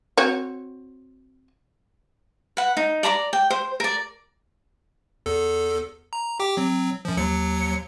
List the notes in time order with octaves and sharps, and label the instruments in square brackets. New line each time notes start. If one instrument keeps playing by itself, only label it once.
[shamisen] C4 F#4 C#5
[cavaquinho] B4 F#5
D#4
D5 A#5 B5 D6
G5
C5
A#4 D5
[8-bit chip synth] E2 A4
A#5
G4 G5 D6
F#3 C4
F#2 F3
D#2 F#3 C#7